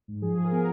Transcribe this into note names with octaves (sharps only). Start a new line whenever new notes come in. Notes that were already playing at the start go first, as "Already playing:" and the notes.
G#2
F3 G#4
F3
A#4
B3